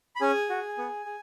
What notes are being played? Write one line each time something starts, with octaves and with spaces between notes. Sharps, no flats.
B5
C#4 G#4 G#5
F#4
B3
G#4